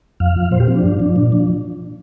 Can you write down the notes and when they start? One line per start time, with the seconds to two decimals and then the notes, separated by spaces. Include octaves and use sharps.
0.20 F2 F5
0.36 F3
0.51 A#2 C5
0.60 G4
0.68 F3 C4
0.75 D4
0.83 G2
1.00 F3
1.16 A#2
1.32 F3